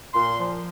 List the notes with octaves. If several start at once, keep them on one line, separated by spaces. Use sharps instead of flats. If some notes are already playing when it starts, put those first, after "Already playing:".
A#2 C6
F3